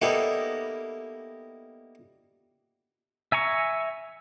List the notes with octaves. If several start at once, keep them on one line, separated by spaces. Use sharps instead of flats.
G3 A#3 B3 D#4 E4 A4
E5 G#5 A#5 C#6